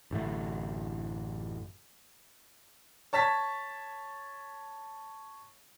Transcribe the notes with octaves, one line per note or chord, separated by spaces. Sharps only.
A1 F#2 D3 A3
C#5 A5 A6 B6